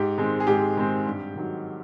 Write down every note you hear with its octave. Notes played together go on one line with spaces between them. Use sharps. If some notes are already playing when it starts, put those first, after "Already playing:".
Already playing: G#2 G4
D#3 G#3 C4
G#4
G#2 G4
D#3 G#3 C4
G2
D#3 F#3